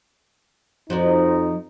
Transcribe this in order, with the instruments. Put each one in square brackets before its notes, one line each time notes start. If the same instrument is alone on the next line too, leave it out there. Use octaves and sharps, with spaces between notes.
[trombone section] F2 D#4 [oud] F3 F#4 D5